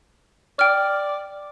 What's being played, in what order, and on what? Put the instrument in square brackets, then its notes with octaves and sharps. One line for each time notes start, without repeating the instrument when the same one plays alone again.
[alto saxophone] D5 [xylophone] G5 F6